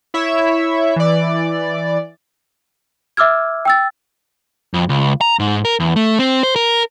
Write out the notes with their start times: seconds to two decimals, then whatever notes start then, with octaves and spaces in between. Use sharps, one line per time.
0.14 E4 C#5 E5
0.96 E3 D5
3.17 E5 D6 E6 F6 G#6
3.65 G5 E6 A6
4.74 F2
4.89 C#2
5.21 A#5
5.39 G#2
5.65 A#4
5.80 E2
5.96 A3
6.19 C4
6.43 C5
6.56 A#4